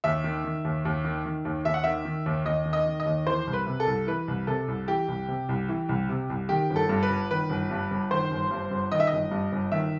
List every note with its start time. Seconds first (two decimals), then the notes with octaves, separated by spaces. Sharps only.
0.04 D#2 E5
0.24 D#3
0.44 D#3
0.65 D#2
0.85 D#2
1.05 D#3
1.26 D#3
1.45 D#2
1.65 D#2 E5
1.74 F#5
1.84 D#3 E5
2.05 D#3
2.26 D#2
2.45 D#2 D#5
2.66 D#3
2.73 D#5
2.86 D#3
3.00 D#5
3.06 D#2
3.27 E3 C5
3.47 C2
3.53 B4
3.66 C3
3.80 A4
3.87 C2
4.07 E3 B4
4.28 C2
4.47 C3 A4
4.68 C2
4.87 E3 G4
5.08 C2
5.28 C3
5.49 C2
5.69 E3
5.89 C2
6.09 C3
6.30 C2
6.49 D#3 G4
6.70 G1
6.76 A4
6.89 G2
7.03 B4
7.10 G1
7.31 D#3 B4
7.50 G1
7.70 G2
7.91 G1
8.11 D#3 C5
8.31 G1
8.51 G2
8.71 G1
8.92 D#3 D#5
9.00 E5
9.07 D#5
9.12 G1
9.31 G2
9.52 G1
9.72 D#3 E5